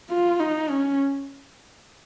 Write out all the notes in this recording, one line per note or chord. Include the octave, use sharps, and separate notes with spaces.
F4
D#4
C#4